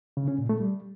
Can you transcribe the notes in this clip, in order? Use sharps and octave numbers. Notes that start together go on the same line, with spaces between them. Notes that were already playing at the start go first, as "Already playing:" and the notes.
C#3
C#4
A#2
A3
G3